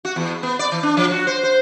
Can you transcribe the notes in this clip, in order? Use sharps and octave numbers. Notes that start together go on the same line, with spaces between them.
F#4
E2
B3
D5
E3
D4
F3
F#4
C5
C5